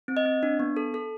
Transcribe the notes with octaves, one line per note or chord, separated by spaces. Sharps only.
C4
D#5
C4
D4
B3
A4
A4